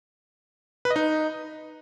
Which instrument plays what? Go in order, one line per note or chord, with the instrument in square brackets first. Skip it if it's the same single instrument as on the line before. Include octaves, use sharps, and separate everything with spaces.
[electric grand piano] B4
D#5
D#4